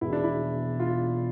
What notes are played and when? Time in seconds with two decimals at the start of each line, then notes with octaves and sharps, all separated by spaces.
0.01 E1 E2 B2 E4
0.13 D4
0.24 E4
0.80 F4